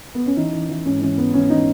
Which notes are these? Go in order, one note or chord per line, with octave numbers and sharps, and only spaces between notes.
B3
C#4
E3 D#4
E3
E3
G#2 C#4
E3 C#4
G#2 B3
E3 C#4
E3 D#4